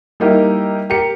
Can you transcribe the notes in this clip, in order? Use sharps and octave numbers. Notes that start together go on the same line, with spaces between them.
G3 A#3 D#4 E4 G4 A#4
G4 A#4 C#7